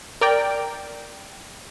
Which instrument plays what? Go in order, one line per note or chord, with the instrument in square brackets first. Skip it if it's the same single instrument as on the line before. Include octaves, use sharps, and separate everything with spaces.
[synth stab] A#4 D5 G5